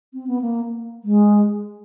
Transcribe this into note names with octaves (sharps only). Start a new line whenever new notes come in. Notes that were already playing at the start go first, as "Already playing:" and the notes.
C4
B3
A#3
G#3